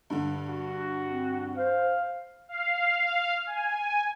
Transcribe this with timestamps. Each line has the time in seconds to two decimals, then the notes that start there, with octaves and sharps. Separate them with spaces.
0.10 G2 D3
0.49 F#4
1.06 C4
1.57 C5 F5
2.49 F5
3.47 G#5